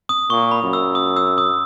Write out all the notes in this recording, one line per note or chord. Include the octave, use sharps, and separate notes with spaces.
D#6
A#2 C#6
B5
F#2
E6
D#6
E6
D#6